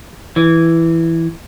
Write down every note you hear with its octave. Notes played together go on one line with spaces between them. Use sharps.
E3